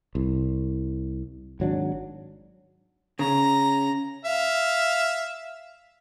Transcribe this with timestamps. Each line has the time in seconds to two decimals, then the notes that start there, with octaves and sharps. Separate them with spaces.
0.15 C2
1.60 G#1 F#3 D4
3.19 C#3 A#5
4.25 E5 F5